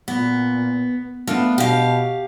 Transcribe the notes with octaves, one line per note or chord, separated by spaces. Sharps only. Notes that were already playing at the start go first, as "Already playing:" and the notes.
A#2 B3
A3 B3 D4 F4
B2 G4 F5